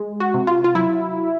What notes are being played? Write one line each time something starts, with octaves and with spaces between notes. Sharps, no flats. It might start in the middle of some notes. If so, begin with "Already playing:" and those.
Already playing: G#3
F#4
C3
F4
F4
F#3 E4